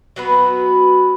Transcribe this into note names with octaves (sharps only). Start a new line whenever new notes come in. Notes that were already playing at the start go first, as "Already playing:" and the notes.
F#3 B3 F#4 B4